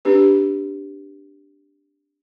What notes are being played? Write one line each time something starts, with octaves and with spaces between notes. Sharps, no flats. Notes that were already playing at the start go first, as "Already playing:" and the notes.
C4 D4 G4 B4